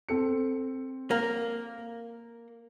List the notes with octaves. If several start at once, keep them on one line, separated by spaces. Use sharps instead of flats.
C4 A4 C#7
A#3